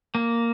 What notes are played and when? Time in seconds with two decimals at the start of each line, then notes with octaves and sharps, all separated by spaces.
0.15 A#3